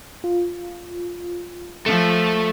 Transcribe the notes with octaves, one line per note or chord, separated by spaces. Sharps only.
F4
F3 A3